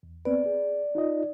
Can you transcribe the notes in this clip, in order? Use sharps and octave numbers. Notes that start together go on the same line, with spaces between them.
E2
B3 C4 B4 D5
G#4
D#4 F4 D#5